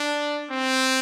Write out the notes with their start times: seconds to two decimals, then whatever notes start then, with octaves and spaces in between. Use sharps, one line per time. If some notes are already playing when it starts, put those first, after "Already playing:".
Already playing: D4
0.51 C4